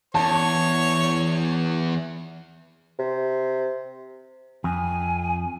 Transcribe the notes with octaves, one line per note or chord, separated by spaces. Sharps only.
E2 C#5 A5 C#6
C3
F2 G#5